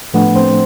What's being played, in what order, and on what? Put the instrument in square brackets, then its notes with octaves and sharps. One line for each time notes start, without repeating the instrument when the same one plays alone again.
[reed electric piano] A2 F3 A3 D4 [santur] B3
[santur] C4